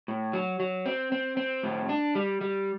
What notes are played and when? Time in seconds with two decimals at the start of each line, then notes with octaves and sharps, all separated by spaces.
0.08 A2
0.33 F#3
0.60 F#3
0.86 C4
1.12 C4
1.37 C4
1.63 A2
1.89 D4
2.15 G3
2.41 G3